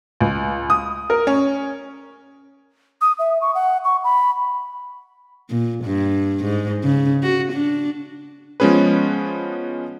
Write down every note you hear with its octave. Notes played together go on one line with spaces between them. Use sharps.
C#2
D#6
A#4
C#4
D#6
E5
C#6
F#5
C#6
B5
A#2
G2
G#2
C#3
F#4
D4
F3 G#3 B3 C#4 G#4 B4